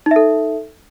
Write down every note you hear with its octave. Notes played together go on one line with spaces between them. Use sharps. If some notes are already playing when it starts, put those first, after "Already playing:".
D#4 A4 E5